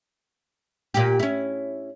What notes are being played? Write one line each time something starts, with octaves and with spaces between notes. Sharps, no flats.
A#2 G4
C#4 E4